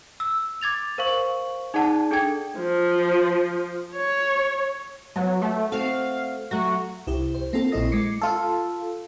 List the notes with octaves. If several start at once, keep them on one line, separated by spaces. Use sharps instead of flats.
E6
D6 G#6 A6 F7
A#4 C5 F5 C#6 F#7
D#4 G#4 D5 F#5 A5
D4 G#4 A4 G5 G#6
F3
C#5
F#3 B3
A3
A3 C4 F#4 F5
F#3 A3 F#4
C2 E4 G4
C5
A#3 C4 F4 A4
A#1 C4 E4 D#5 D#6 A#6
G#3 D6 C7 C#7
F4 A4